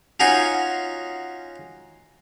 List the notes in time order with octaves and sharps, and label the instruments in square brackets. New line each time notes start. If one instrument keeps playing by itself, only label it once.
[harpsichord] C#4 D#4 F4 F#4 F#5 G#5